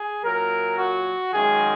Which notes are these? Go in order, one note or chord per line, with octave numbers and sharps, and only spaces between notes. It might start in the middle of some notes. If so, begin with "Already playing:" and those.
Already playing: G#4
A#2 F#3 A#4
F#4
F#2 D#3 G#3 G#4